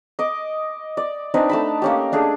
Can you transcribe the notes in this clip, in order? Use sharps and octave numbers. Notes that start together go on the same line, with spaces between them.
D#5 D6
D5
C4 D4 D#4 B4
A3 A5 B5
A#3 C#4 G4
A3 D4 G#4 G#5